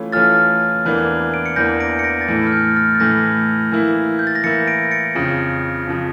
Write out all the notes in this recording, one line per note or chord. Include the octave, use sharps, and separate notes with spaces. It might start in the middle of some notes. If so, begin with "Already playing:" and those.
Already playing: E3 A3 C#4 F4
E3 A3 C#4 F4 F6 A6
E2 E3 A#3 D4
D7
C#7
E2 E3 A#3 D4 G6 A#6
A#6 D7
C#7
A#6 D7
A6
A2 E3 A3 G6
F6
G6
F6 A6
A6
A2 E3 A3 G6 A#6
E3 A#3 E4
G6
A6
A#6
E3 A#3 E4 A6 C#7
A#6 D7
A6 C#7
F2 C#3 F3
F2 C#3 F3